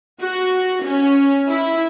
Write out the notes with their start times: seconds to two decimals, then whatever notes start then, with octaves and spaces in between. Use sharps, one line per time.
0.21 F#4
0.84 C#4
1.49 E4